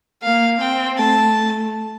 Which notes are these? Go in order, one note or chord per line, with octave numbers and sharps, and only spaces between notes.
A#3 F5
C4 G5
A3 A5